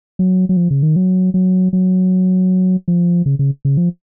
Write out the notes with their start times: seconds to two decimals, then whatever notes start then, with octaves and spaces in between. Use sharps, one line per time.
0.19 F#3
0.49 F#3
0.57 F3
0.70 C#3
0.83 D#3
0.96 F#3
1.34 F#3
1.73 F#3
2.88 F3
3.26 C#3
3.39 C#3
3.65 C#3
3.77 F3